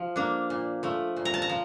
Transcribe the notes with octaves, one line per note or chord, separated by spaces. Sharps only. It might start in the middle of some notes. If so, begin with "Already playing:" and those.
Already playing: F3
A#3 D4
A#2
F3 A3
A#2
A#5
A5
A#5
F3